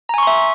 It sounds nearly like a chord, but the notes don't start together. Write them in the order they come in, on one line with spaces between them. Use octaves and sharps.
A#5 G#5 C#6 C6 E5